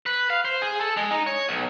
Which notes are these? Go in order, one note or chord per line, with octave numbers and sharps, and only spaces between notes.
B4
F5
C5
G#4
A4
G#3
D#4
C#5
B1